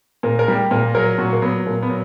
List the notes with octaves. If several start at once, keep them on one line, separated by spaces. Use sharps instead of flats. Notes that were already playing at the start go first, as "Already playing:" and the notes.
A#2 A#4
A#4
G3
G4
A#2 A#4
F#3 A#4
A#2 F#4
A#3
F#3 B3
A#2 A#3
B3
F#3